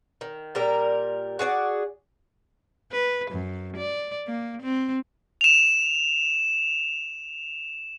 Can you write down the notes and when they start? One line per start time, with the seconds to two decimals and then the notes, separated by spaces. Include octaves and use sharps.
0.21 D#3
0.55 A#2 G3 A#4
1.39 F#4 G#4 C#5 D5
2.92 B4
3.31 F#2
3.77 D5
4.27 A#3
4.62 C4
5.41 E7 F7